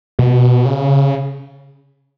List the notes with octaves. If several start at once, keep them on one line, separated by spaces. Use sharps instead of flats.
B2
C#3